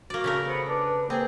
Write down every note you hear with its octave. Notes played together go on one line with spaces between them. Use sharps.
A#3 F#4 D5
C#3 A3 A#4
B3 C5
D4 B4
A#3 C4 G#4